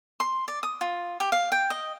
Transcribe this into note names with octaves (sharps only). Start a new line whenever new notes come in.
C6
D5
D#6
F4
G4
F5
G5
D#5